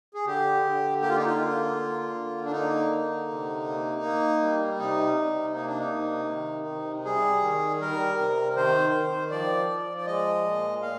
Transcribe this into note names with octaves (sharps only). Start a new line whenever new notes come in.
G#4
D3 G4
D3
A#3 G4
F4
D#4
F4
D3
A#3
D3
D4
A#3 D#4
D3
C3
A#3
A#3
G3
C3 D#4
C3
A#3 D#4
D4
D#4
C3
D#3
C3
G3 G#4
D#3
G3 A#4
C3
D#3 C5
D#3
F3 D5
F3
D5
G#3 D#5
A#2
A#2 F5